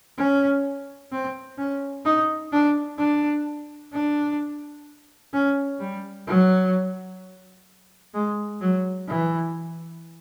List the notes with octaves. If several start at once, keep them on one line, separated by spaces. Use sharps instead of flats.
C#4
C4
C#4
D#4
D4
D4
D4
C#4
G3
F#3
G#3
F#3
E3